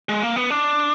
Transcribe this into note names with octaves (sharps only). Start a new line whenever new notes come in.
G#3
A#3
B3
D4